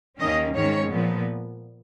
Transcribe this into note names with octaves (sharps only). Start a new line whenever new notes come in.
D#2 D#3 A#3 C#4 D#5
G#2 D#3 G#3 C#4 C#5
A#2 F3 B3